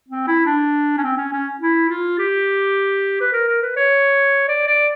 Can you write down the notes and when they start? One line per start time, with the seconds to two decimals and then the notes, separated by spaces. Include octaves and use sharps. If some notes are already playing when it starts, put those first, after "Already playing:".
0.08 C4
0.27 E4
0.46 D4
0.98 C#4
1.04 C4
1.17 C#4
1.33 C#4
1.61 E4
1.89 F4
2.19 G4
3.21 B4
3.33 A#4
3.48 A#4
3.62 B4
3.76 C#5
4.48 D5
4.68 D5